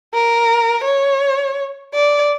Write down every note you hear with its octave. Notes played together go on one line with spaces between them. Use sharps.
A#4
C#5
D5